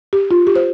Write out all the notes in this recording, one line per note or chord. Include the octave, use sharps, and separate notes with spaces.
G4
F4
G4
C5